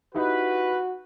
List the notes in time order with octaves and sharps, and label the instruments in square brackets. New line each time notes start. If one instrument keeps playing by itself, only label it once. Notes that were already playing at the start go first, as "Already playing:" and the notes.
[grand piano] D#4 E4 G4 [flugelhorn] F#4 [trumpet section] B4